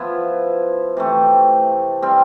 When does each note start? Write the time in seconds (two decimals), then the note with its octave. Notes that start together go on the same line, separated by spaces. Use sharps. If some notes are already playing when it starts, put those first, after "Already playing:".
Already playing: F3 B3 E4
0.97 C3 E3 A3
2.02 G3 C4 G4